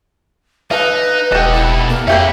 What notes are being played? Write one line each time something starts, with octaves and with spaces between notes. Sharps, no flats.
D#4 A4 B4 F5
E1 G4 A4 D#5 F#5
B2 E4 A4
A#3
F2 A#3 G4 B4 C#5 E5 F5